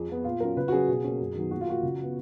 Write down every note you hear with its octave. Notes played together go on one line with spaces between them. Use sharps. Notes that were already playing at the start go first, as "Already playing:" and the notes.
Already playing: F2 G#4
F3 B3
A#2 F4
F#3 C#4 A#4
C#3 B4
F#4
F#3 C#4 G#4
B2
A#3 C#4
F#2
D#3 F#3 B3
A#2 F#4
F4
F3 A#3 F#4
C#3
F3 B3